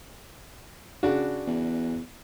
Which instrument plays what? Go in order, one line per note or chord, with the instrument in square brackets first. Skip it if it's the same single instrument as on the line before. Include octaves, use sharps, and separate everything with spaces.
[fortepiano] C#3 D4 F#4
[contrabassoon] E2